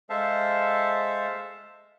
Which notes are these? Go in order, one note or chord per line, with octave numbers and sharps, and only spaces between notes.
G#3 A4 C5 E5 F5 A5